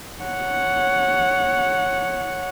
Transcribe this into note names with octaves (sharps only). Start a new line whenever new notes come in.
C#5 F#5